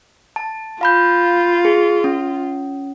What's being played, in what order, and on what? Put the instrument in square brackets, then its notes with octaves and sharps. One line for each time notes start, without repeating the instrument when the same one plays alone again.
[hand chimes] A5
[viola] F4 [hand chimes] F5 B5 G6
[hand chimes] G#4
C#4